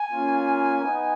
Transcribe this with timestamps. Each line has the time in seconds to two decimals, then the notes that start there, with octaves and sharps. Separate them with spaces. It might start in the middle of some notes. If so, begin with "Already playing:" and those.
Already playing: G#5
0.11 A#3 C#4 F4
0.82 B3 D#4